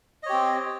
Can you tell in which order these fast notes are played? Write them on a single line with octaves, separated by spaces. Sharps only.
D#5 C#5 G4 C4